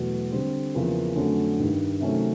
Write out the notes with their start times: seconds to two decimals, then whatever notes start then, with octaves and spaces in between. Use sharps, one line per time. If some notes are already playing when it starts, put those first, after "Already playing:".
Already playing: E2 B2 F#3 A3
0.32 D3 G3 C4
0.74 E2 C#3 F3 A#3
1.16 F2 D3 F#3 A3 C#4
1.59 G2 D#3 G3
2.00 C3 D#3 F#3 A3 C#4